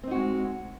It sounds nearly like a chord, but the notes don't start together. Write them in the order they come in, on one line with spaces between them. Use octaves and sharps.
C4 D#4 F#4 G#3